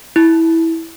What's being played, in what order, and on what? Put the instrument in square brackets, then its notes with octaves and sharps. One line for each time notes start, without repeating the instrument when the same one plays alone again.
[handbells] E4